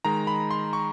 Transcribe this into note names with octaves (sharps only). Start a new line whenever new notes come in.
D#3 G#3 A#5
B5
C6
C#6